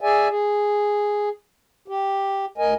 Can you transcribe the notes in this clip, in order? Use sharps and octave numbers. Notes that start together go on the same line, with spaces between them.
G#4 D5 E5 G#5
G#4
G4
D2 A#4 D#5 G#5